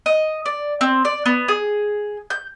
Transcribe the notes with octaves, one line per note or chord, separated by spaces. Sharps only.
D#5
D5
C4
D5
B3
G#4
G6